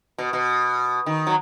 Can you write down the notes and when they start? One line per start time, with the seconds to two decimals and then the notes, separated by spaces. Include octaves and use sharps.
0.18 B2
0.33 B2
1.06 D#3
1.27 F#3